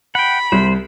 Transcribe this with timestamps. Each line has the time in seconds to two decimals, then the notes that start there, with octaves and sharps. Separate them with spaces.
0.15 F#5 G5 B5
0.52 C2 C5